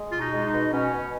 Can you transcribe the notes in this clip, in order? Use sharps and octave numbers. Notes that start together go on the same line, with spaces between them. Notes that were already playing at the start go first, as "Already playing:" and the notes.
Already playing: G#3
B2 F4
D#4
G#3
D#4
B2
B2 C#4
B2